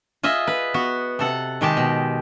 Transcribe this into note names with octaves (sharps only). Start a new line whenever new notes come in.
F4 G#4 D#5 E5
B4
B3 F#4
C3 A4 F#5
D#3 G#3 G4 A5
B2